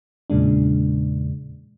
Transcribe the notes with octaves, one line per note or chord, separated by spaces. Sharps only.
E2 A#2 C#3 G#3 D4